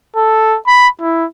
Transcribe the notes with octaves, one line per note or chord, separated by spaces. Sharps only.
A4
B5
E4